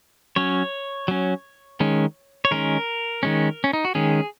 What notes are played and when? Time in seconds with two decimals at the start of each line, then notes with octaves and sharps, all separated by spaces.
0.36 F#3 C#4 C#5
1.08 F#3 C#4
1.80 D#3 G#3 C#4
2.45 C#5
2.51 D#3 G#3 C#4 A#4
3.23 D#3 G#3 C#4
3.64 C#4
3.73 D#4
3.85 F#4
3.95 D#3 G#3 C#4 G#4